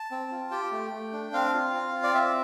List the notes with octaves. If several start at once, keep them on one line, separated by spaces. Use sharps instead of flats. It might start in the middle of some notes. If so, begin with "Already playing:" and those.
Already playing: A5
C4
F4
G4 G5
A3
A3
D4
C4 F5
F4
C4
F4
D5
C4 E5